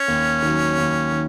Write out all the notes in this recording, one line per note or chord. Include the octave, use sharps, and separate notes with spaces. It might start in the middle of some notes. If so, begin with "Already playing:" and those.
Already playing: C#4
D#2
D#3 F#3
D#2
D#3